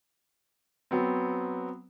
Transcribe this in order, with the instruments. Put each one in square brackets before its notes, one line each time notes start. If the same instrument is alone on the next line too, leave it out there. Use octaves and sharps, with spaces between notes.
[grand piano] F#3 B3 C4